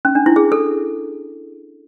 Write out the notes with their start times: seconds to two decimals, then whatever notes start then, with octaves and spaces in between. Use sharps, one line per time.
0.05 C#4
0.15 D4
0.26 E4
0.36 G#4
0.52 A4